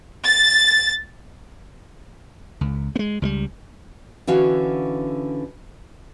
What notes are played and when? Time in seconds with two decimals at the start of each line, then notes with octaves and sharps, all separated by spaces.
0.25 A6
2.61 C#2
2.96 G#3 B3
3.22 C#2 F3 G3
4.27 D3 E3 C#4 F#4 F5